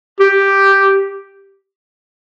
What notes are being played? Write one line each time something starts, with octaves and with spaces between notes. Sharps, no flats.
G4